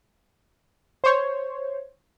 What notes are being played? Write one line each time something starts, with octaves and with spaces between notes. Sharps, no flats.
C5 C#5